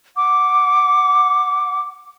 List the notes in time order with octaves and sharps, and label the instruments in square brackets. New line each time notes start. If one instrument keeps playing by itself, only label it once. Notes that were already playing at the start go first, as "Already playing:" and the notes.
[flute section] F#5 D6